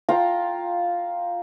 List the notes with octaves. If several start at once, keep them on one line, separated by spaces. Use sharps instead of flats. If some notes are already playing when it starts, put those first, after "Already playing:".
F4 G5 A#5